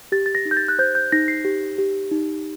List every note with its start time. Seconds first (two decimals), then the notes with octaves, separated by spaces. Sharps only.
0.12 G4 A6
0.26 A6
0.35 A#6
0.45 D#4
0.51 G6
0.57 A6
0.68 F#6
0.79 C5 G6
0.95 G6
1.12 D#4 A#6
1.28 C7
1.45 G4
1.78 G4
2.11 D#4